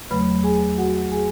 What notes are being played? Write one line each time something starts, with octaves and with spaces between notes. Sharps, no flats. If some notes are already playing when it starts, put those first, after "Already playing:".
E2 C#3 F#3 A3 B4 B5
G#4 G#5
F#4 F#5
G#4 G#5